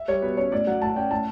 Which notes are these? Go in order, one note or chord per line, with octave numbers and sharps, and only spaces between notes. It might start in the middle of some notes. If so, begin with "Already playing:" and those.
Already playing: E5
G3 C#5
B2 B4
C#4 C#5
A2 D5
F#3 F#5
A2 A5
C#4 G5
A2 A5